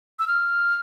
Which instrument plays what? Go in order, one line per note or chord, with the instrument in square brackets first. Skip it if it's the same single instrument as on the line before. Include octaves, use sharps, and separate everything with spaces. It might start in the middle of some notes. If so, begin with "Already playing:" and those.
[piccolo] E6
F6